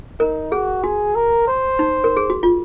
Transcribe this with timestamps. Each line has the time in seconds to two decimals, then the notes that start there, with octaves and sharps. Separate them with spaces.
0.20 D#4 A#4
0.52 F#4 G#4
0.83 F#4 G#4
1.15 A#4
1.48 C5
1.79 D#4
2.04 A#4
2.17 G#4
2.30 F#4
2.43 F4